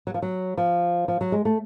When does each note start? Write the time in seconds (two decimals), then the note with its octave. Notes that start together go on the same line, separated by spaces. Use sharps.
0.07 F#3
0.14 F3
0.22 F#3
0.57 F3
1.08 F3
1.21 F#3
1.32 G#3
1.45 A3